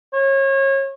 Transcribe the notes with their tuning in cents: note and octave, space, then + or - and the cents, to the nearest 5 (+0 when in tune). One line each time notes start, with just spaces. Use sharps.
C#5 -30